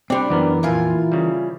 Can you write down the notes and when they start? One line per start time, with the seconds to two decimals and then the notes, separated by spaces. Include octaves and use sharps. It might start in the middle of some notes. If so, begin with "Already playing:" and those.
0.10 G3 C4 D4 G4 C5
0.30 F#2 E3 B3 A#4
0.63 F2 A#2 E4 F4 G#5
1.12 C#3 G3